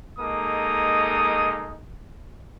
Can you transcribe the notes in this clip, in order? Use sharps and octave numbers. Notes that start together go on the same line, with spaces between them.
G#3 A#3 D#4 A4 D#6